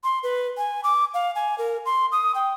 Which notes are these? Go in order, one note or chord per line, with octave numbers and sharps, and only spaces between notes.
C6
B4
G#5
D6
F5
G#5
A#4
C6
D#6
G5